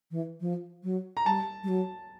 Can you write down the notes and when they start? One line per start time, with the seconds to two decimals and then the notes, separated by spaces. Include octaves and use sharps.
0.11 E3
0.41 F3
0.83 F#3
1.17 A#5
1.26 G3 A5
1.63 G3
1.68 F#3